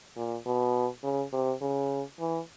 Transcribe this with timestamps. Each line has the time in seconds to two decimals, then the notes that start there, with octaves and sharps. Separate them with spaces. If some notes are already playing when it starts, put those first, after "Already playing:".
0.17 A#2
0.46 B2
1.03 C#3
1.32 C3
1.61 C#3
2.20 E3